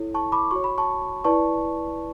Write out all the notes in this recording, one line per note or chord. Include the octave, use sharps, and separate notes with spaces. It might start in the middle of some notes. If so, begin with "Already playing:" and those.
Already playing: E4 A4 C#5
A5 C#6
B5 D6
F#4 C#5 C#6
B5
A5 C#6
E4 B4 D5 A5 C#6